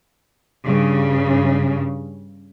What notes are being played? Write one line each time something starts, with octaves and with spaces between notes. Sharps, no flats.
G2 C#3